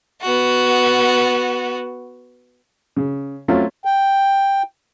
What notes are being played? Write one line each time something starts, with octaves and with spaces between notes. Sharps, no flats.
B3 F#4
C#3
F#3 A3 C4 C#4 F4 F5
G5